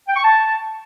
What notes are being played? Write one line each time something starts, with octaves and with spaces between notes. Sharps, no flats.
G5
C#6
A5